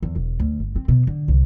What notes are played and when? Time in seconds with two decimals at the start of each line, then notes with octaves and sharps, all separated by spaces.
0.03 E2
0.15 E1
0.40 D2
0.60 G1
0.76 C4
0.88 B2
1.07 D3
1.28 C2